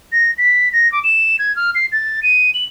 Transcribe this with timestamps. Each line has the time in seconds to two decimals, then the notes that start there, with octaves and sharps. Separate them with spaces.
0.12 A#6
0.38 B6
0.73 A#6
0.92 D6
1.04 E7
1.39 G#6
1.56 F6
1.75 C7
1.92 A6
2.23 D#7
2.54 F#7